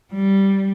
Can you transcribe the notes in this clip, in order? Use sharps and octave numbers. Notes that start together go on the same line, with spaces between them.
G3